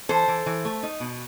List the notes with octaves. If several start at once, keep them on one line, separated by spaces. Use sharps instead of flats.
E3 A4 C5
E3
E3
A3
D#4
B2